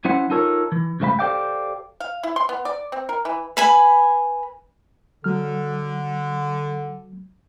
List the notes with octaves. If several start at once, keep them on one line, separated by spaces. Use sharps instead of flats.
F#3 C#4 E4 C5 F#5
D#4 F4 A4 A#4 C#5
E3
C#2 G2 A3 C5 F5 B5
G4 A4 C5 D5 F5 G5
F5
E4
C6
B3
D5
C4
A#4
E3
B4 G#5 B5
D3 F#3 F6